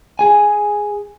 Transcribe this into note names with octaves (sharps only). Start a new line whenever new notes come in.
G#4 G#5